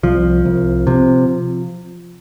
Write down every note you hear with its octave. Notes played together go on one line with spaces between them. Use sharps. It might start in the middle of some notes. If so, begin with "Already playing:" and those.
C2 F3
C2
C3